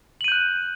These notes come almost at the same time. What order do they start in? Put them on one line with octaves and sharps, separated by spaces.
F#7 D#7 G6 F#6